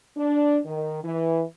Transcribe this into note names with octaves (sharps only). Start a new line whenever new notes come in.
D4
D#3
E3